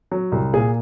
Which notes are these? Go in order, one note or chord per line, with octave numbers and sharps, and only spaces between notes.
F#3
C2
A#2 G#4